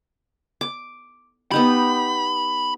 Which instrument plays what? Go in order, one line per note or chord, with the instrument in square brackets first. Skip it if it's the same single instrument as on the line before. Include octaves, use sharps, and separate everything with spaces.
[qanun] D6
[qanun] B3 D#4 G4 [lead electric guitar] B5